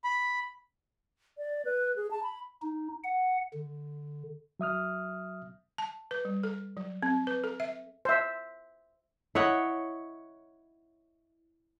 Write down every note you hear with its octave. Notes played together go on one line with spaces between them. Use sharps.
B5
D5
B4
G#4
A5
B5
D#4
F#5
D3
F#3 E5 D#6 F6
A5
B4
G3
A4
F#3
C4
B4
A4
E5
C5 E5
E4 C#5 D#5 F#5